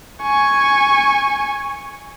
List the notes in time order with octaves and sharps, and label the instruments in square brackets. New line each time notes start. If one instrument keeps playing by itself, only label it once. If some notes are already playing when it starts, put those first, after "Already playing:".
[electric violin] G#5 C#6